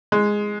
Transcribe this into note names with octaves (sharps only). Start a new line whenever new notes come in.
G#3